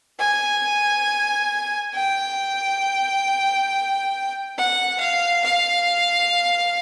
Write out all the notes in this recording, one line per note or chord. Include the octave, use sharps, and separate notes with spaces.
G#5
G5
F#5
F5
F5